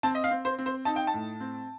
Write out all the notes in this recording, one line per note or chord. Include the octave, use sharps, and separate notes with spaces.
C4 A5
D#5
F5
C4
C5
C4
C5
D#4 A5
G5
A5
A2
C4